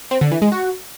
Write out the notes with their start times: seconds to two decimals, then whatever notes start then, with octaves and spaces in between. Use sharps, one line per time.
0.11 C4
0.21 D3
0.31 E3
0.42 G#3
0.52 F#4